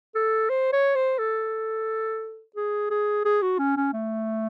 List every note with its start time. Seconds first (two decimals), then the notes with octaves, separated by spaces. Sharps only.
0.15 A4
0.50 C5
0.73 C#5
0.95 C5
1.18 A4
2.56 G#4
2.90 G#4
3.25 G#4
3.42 F#4
3.58 C#4
3.77 C#4
3.93 A3